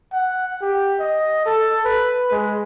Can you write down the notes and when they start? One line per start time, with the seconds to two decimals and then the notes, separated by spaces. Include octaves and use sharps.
0.12 F#5
0.61 G4
1.00 D#5
1.46 A4
1.85 B4
2.31 G#3